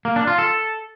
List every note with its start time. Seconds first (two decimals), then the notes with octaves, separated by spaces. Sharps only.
0.05 A#3
0.16 D4
0.27 F4
0.38 A4